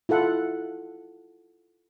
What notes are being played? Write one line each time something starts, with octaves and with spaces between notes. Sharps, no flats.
E4 F4 A4 F#5